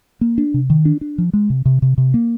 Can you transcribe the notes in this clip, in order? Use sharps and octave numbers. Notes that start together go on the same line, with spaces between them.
A#3
D4
C3
D#3
D4
D4
F3
G#3
C3
C3
C3
C3
A#3